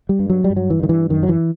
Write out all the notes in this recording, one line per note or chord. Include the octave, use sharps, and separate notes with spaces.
G3
G2
F#3
G3
G2
F#3
E3
G2 D#3
E3
F#2 D#3
F#3
E3